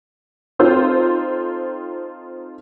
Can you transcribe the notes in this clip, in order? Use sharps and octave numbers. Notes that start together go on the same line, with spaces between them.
C4 D#4 F4 A4 C5